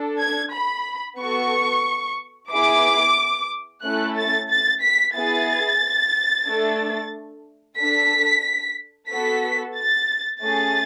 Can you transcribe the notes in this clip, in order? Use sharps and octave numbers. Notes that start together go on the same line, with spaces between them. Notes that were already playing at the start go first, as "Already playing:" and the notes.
Already playing: D4 A4
G#6
B5
B3 F#4 A4 C#6
B3 E4 G#4 D6
A3 C#4 E4 A4 F#6
A6
A6
B6
B3 E4 G#4 A6
A3 D4 A4
D4 A4 B6
B3 F#4 A4 B6
A6
A3 C#4 G#4 A6